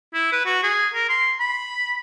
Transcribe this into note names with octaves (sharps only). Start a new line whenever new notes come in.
E4
B4
F#4
G#4
A#4
C6
B5